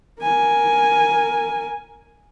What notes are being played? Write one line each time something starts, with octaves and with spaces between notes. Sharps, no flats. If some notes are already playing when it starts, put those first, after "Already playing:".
A#4 G#5